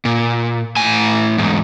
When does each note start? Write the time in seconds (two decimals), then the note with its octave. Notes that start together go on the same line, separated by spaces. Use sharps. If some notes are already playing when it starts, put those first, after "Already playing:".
0.05 A#2
0.77 A2 G#5
1.38 E2 G#2